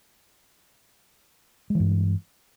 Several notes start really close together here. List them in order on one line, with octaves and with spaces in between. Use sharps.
G#3 E3 G2